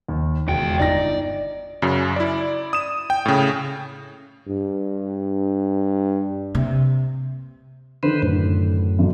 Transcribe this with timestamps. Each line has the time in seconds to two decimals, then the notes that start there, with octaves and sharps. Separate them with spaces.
0.08 D#2
0.48 E1 C#2 G5
0.79 G1 D#4 D5 A#6
1.82 F#2 C#3 F#3
2.16 E4 D5
2.73 D#6 E7
3.10 G5
3.26 A2 C#3
4.49 G2
6.55 C3
8.03 D3 D#3 B4 C5
8.23 F#2 A2
8.98 G1 F#3